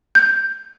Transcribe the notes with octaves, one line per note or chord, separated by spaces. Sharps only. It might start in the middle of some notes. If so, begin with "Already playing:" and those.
G6